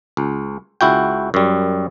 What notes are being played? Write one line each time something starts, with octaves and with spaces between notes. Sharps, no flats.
C#2
C#2 E4 F#4 G5
F#2 G3